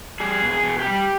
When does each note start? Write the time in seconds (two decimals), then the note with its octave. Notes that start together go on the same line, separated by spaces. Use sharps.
0.20 G3 G#4
0.42 B2
0.49 G#4
0.63 B2
0.79 G4
0.86 G3